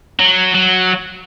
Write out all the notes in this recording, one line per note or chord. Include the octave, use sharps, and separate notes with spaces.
F#3
F#3